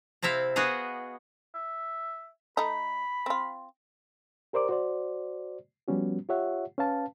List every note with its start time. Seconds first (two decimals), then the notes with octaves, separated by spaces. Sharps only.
0.22 C3 C4 E4 E5 F5
0.56 B3 F#4 G#4 D#5 F5
1.55 E5
2.57 A3 D#4 B5
3.26 C4 F4
4.53 G4 A#4 C5 D5 D6
4.69 F#4 C5 D5
5.88 F3 G3 B3 C#4 F#4
6.29 F4 G4 C#5 E5 F#5
6.78 C#4 B4 F5 A5